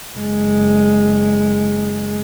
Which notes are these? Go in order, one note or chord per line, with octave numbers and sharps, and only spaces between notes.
F#1 G#3